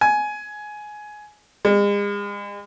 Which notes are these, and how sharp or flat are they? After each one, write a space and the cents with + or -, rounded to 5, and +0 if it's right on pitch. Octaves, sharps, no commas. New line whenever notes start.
G#5 +15
G#3 -40